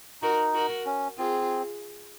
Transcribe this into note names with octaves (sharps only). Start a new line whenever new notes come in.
D#4 F#4 A#4
F#4 A#4
C#4
C4 F4 G#4